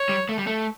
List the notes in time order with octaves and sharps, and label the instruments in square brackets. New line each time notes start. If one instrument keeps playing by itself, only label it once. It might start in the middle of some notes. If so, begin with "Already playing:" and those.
Already playing: [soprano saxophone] C#5
[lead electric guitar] G3
A3
G3
A3